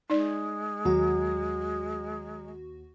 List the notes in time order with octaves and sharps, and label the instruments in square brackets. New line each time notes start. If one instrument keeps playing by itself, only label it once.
[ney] G#3 [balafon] D#4 D5
[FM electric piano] D#2 F#4 [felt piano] F#3